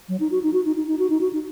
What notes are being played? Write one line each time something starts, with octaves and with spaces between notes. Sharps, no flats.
F#3
D#4
F#4
D#4
F#4
D#4
D#4
D#4
F#4
D#4
F#4
D#4